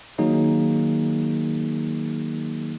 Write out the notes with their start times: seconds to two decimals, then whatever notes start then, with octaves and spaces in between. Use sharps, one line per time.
0.18 D#3 F#3 A#3 D#4 G#4